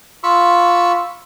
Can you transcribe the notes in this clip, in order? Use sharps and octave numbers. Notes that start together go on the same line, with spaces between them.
F4 B5 C#6 E6